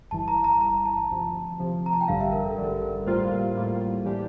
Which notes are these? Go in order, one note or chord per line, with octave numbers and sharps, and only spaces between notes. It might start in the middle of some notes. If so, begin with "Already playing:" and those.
G1 G2 E3 A5
A#5
A#5
G1 G2 E3 A#5
A5
D2 C3 F3
D2 C3 F3
A#5
A5
G5
A1 G2 D3 G3 F5
E5
A#4
A4
A1 G2 D3 G3 A#4
A#4
A2 G3 A#3 F4 C5
A#4
A2 G3 A#3 F4
E3 G3 D4 G4